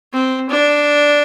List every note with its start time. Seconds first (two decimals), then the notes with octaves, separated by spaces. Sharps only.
0.13 C4
0.50 D4